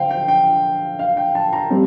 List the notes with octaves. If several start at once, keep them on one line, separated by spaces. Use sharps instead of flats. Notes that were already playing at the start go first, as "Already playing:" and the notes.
Already playing: D3 C5 F5 G5
G5
G5
F5
G5
A5
A#5
G3 C4